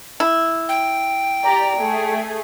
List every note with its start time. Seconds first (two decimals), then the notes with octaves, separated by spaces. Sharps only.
0.20 E4
0.69 G5
1.44 G4 D5 A#5
1.76 A3 G#4